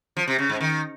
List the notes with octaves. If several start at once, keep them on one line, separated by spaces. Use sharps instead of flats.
F3
C3
C#3
G#2
D#3